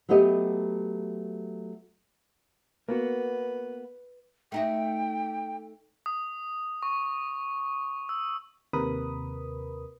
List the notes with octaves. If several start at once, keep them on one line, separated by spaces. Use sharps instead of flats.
F#3 A3 B3 G4 D#5
A#3 B3 F#4 B4
A3 D#4 F#4 G5
D#6
C#6
E6
D#2 C3 A#4 B4 B5 D#6